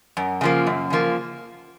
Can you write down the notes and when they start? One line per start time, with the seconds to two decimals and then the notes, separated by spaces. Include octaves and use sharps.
0.17 F#2
0.41 C#3 F3 A#3
0.67 F#2
0.90 C#3 F3 A#3